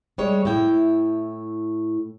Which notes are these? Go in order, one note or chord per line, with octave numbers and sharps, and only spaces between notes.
G3 G#3 C#5
A2 E4 G5